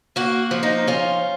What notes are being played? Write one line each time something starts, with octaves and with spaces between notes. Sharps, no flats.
A#3 F#4
F3
D#4
C#4 F4